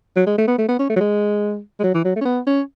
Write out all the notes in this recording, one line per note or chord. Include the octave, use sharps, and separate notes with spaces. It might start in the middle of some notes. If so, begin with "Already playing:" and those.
F#3
G#3
A3
B3
A3
B3
C#4
A3
F#3
G#3
G#3
F#3
E3
F#3
A3
C#4
B3
C#4